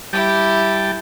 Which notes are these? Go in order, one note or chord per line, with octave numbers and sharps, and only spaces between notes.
G3 E4 G4 G5 A5